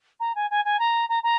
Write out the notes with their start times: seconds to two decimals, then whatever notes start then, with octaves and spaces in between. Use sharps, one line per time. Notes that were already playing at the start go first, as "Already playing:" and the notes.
0.20 A#5
0.35 G#5
0.50 G#5
0.64 G#5
0.79 A#5
1.09 A#5
1.23 A#5